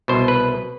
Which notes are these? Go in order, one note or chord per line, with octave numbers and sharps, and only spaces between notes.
C2 B2 C5
B4